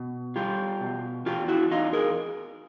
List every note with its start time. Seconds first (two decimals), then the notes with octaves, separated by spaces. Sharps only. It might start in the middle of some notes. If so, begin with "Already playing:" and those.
Already playing: B2
0.36 G3 F4 G4
0.81 B2
1.26 E2 F4 G4
1.48 E4 F#4
1.71 E2 D#4 F4
1.93 G#4 A#4